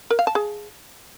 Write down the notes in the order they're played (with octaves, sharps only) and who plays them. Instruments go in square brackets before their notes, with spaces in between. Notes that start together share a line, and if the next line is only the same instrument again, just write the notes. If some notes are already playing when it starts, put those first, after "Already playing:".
[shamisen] A#4
F5
A5
G#4